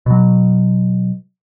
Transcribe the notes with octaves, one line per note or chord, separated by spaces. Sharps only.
B2 F#3